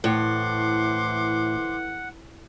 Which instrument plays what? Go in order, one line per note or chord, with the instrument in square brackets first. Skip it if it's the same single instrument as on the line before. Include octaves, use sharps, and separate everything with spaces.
[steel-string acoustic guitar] A2 [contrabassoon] E3 [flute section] C5 C6 D6 [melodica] F#5